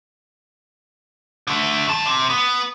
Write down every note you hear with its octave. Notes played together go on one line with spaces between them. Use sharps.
D3 A3
D#3 A5
C3
B3